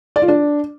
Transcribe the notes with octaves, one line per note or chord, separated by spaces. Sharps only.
D5
F4
D4